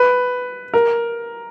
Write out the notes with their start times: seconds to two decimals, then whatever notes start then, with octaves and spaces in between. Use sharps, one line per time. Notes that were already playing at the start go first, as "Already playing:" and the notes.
Already playing: B4
0.73 A#4